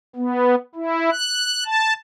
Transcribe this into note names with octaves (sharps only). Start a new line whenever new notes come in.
B3
E4
F#6
A5